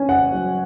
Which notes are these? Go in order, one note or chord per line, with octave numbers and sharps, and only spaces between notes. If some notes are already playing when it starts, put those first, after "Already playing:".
Already playing: C#4 G#5
F#5
F#3